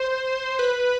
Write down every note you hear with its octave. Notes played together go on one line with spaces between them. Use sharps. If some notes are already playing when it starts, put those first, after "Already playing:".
Already playing: C5
B4